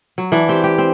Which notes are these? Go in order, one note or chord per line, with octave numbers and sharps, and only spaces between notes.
F#3
E3 D4
C4 G4
G4
C4